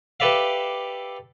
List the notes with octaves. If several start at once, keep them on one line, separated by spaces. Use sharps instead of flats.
G4 A4 B4 D5 E5 F5